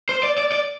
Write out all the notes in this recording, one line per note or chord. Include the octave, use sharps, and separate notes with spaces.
C5
D5
D5
D5